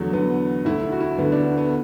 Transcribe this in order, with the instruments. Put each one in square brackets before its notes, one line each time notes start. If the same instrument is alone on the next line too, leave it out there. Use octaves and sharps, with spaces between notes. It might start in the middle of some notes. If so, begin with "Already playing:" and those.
Already playing: [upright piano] E2 D3 F#3 A3
E2 D3 B3
D2 D3 E4
E4
F#4
E4
D2 D3 B3
D4
B3
B3